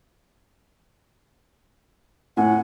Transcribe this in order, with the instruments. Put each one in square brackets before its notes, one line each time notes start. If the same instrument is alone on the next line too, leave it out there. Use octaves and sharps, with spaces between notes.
[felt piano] A2 G#5 [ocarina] F#5